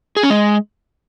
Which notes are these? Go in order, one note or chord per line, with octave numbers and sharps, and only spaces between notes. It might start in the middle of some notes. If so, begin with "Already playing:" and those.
G#4
C#4
G#3